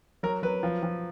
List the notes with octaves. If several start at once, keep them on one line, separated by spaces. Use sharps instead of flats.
F#3 A#4
F#3 B4
F3
F3